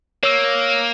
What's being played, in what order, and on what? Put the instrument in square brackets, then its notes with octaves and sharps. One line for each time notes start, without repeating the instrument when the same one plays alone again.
[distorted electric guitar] A#3 [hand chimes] C#5 E6